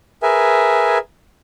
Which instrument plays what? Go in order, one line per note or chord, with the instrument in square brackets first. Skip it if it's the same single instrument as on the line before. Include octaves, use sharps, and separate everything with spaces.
[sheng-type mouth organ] G#4 A#4 B4 E5 G#5